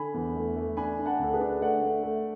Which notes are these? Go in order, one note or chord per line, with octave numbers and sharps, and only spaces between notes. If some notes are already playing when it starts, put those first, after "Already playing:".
Already playing: D3 G#5 B5
E2
A3
A3
D4 G#5 B5
D4
F#5 A5
D2 A4
G#4 B4
D4
A3 D5 F#5
A3
A3